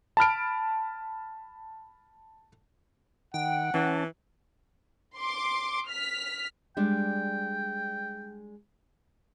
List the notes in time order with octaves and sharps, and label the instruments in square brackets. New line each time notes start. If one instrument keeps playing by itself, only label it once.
[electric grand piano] A5 B5 F6 D7
[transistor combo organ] D#3 [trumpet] F#5 [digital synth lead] G5
[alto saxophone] E3 [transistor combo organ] C#4 A5
[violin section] C6 D6
F6 B6
[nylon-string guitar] G3 G#3 D4 [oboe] G5